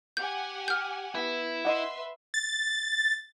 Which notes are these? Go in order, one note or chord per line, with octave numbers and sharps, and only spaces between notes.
G4 F#5 G#5 G6
F6 G6
B3 E4
B4 D#5 E5 F#5 C6
A6